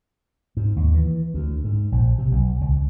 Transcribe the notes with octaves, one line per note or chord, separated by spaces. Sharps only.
G#2
D#2
E3
D2
G#2
A#1
C3
B1
C#2